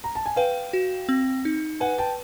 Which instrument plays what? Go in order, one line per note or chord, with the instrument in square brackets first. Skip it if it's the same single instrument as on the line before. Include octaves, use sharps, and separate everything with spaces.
[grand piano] A#5
A5
G#5
[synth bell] B4 [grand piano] F5 G5
[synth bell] F#4
C4
D#4
[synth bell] B4 [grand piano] F#5 G#5
[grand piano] G5 A5